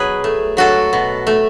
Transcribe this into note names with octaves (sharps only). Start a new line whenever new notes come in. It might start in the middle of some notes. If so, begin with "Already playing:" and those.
Already playing: B2 F#3 G#4 B4
A3
F#3 F#4 A4
B2
A3